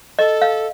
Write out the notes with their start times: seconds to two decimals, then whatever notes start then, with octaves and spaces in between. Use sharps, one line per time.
0.19 A4 D#5
0.42 F5